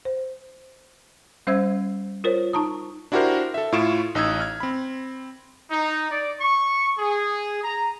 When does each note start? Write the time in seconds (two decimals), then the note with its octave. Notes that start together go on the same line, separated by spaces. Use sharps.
0.05 C5
1.47 G3 C#4 C5 E5 E6 G#6
2.24 F4 A#4 C5 C#5
2.53 D#4 A5 A#5 D#6
3.12 D4 E4 F#4 G4 A#4 C5
3.54 A4 E5
3.72 A2 E4 F4 C#6 D7 E7
4.15 A1 D#4 D#6 E6 G#6
4.40 F6 G#6
4.60 C4 B5
5.71 D#4
6.10 D5
6.41 C#6
6.98 G#4
7.64 A#5